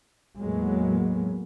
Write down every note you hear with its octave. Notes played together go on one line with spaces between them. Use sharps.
E2 A2 F#3 G#3 A#3 B3